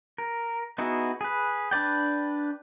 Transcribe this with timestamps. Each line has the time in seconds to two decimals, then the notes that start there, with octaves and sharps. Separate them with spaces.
0.18 A#4
0.78 B3 D#4 E4 F#4 G#4
1.21 G#4 B4
1.71 D4 B4 D5 G5